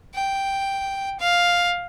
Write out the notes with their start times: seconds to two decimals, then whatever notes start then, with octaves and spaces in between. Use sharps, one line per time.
0.14 G5
1.19 F5